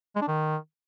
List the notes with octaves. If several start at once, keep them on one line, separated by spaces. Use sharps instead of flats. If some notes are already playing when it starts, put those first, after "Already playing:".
G#3
D4
D#3